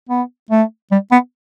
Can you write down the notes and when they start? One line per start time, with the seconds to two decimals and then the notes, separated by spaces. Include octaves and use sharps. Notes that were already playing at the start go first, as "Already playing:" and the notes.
0.09 B3
0.50 A3
0.91 G3
1.11 B3